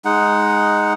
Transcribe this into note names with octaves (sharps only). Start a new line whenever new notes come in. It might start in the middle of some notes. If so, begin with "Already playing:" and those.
G#3 D#4 F#5